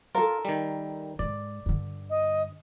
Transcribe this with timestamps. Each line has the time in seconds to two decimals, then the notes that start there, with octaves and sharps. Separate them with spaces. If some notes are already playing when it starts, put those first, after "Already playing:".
0.15 F4 A4 A#4
0.45 D#3 G3
1.19 G#2 D5
1.66 G2 D3
2.10 D#5